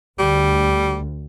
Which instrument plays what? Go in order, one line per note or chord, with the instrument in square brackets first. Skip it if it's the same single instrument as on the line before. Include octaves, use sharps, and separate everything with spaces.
[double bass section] D2 [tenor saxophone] G3